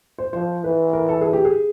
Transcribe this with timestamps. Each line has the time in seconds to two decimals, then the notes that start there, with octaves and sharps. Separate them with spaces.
0.18 C5
0.33 F3 C5
0.63 E3 B4
0.93 A#4
1.09 A4
1.21 G#4
1.33 G4
1.45 G#4